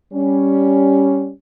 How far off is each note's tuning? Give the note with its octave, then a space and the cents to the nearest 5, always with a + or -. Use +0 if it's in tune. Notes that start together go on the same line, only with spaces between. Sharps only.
G3 +0 C#4 +5